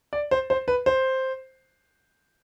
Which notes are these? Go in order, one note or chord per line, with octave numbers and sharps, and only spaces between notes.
D5
C5
C5
B4
C5